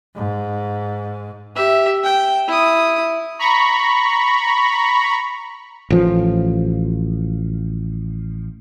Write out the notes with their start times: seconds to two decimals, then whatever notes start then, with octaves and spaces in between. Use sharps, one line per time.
0.16 G#2
1.55 G4 E5
2.04 G5
2.47 E4 D#6
3.39 A#5 B5 C#6
5.90 A1 F3